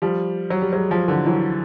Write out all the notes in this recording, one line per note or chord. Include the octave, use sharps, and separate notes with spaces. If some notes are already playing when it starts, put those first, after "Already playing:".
F3 G3
F#3
G3
F#3 G#3
F3 G3
D3 E3
E3 F#3